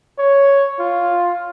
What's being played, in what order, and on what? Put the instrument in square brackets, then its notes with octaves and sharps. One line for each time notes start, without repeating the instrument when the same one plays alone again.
[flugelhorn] C#5
F4